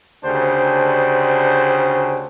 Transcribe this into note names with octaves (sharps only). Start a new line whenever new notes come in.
D2 C#3 D4 G4 C5